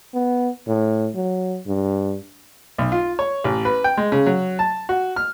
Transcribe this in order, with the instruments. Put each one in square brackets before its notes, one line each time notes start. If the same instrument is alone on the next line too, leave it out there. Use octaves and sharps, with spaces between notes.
[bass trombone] B3
A2
F#3
G2
[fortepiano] B1
F4
C#5
A1
B4
G5
G#3
C#3
F#3
A5
F#4
F6